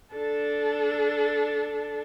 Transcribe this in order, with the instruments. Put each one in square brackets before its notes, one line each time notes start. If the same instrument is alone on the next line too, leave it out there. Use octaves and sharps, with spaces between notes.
[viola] D4 A4